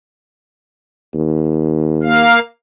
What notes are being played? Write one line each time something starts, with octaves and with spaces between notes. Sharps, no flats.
D#2
A#3 F5